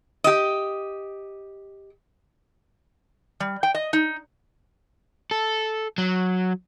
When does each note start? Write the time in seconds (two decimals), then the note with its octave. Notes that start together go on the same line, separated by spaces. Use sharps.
0.24 G4 D#5
3.40 G3
3.63 G5
3.75 D#5
3.93 D#4
5.31 A4
5.98 F#3